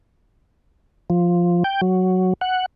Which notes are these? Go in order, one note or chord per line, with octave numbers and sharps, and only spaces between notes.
F3
G5
F#3
F#5